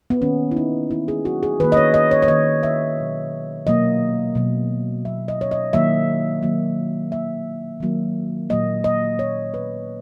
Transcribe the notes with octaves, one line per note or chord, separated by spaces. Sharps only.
B3
D#3 A#3 C#4
E4
D#4
D#3 A#3 E4
G#4
F#4
G#4
D#3 A#3 B4
D#5
C#5
D#5
C#5
C#5
D#3 A#3 D#5
E5
B2 F#3 A#3
B2 F#3 A#3 D#5
B2 F#3 A#3
B2 F#3 A#3 E5
D#5
C#5
D#5
D#3 F#3 A#3 E5
D#3 F#3 A#3
D#3 F#3 A#3 E5
D#3 F#3 A#3
A#2 F#3 A#3 D#5
D#5
A#2 F#3 A#3 C#5
B4